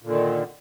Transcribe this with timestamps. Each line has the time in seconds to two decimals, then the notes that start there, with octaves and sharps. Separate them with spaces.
0.02 A#2
0.05 D3
0.09 D#3